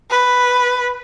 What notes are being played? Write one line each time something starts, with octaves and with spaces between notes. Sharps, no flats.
B4